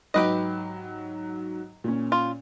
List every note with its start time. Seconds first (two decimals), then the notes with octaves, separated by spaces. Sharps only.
0.14 G#2 F#3 G4 B4 D#5
1.84 A#2 C#4
2.12 F4